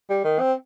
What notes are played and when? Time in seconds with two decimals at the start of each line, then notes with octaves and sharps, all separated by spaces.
0.10 G3
0.24 D#3
0.40 C4